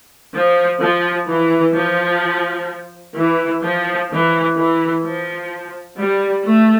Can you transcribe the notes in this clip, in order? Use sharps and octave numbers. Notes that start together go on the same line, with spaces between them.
F3
F3
E3
F3
E3
F3
E3
E3
F3
G3
A3